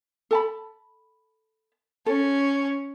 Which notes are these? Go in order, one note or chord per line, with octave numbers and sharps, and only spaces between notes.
A4 A5 B5
C#4 A4